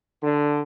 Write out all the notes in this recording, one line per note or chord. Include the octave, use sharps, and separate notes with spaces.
D3